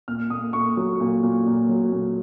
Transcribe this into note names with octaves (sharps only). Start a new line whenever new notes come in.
A#2 F6
A#2 D#6
A#2 C#6
F#3
A#2
A#2
A#2
F#3
A#2